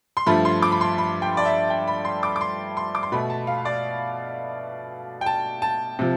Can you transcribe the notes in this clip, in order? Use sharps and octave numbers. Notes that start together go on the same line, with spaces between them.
C6
G2 F3 A3 B5
C6
D6
B5
C6
B5
G5
D5
E5
G5
B5
C6
D6
D6
C6
C6
D6
C6
B2 A3 B5
A5
F5
D5
G5
A5
A5
C3 F3